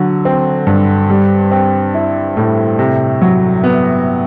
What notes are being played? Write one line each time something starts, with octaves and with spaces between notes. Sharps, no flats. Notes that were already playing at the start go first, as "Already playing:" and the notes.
Already playing: D3 F#3
C4
G2
G3
C4
E4
A2
C3
F#3
B3